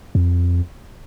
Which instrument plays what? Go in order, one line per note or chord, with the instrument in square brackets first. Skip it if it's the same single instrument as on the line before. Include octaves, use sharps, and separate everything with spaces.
[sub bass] F2